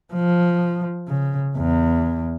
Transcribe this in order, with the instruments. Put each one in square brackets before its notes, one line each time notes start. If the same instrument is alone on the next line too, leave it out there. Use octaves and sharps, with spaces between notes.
[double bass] F3
C#3
E2